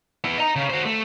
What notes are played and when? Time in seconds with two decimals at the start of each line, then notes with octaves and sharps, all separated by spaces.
0.24 B3 E4
0.38 D#5 A#5
0.56 C#3
0.70 F#4 C5
0.85 A3